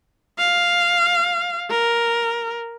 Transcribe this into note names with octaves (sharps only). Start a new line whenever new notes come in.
F5
A#4